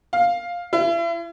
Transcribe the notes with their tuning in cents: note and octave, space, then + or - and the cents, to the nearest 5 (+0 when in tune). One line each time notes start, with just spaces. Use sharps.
F5 +5
E4 +40